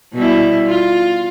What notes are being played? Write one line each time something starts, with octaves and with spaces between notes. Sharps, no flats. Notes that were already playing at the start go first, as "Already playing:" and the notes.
B2 G3 E4
F4